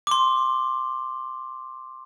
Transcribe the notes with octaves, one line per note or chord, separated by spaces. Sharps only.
C6 D6